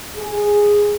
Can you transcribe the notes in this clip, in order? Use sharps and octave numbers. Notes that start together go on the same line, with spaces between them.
G#4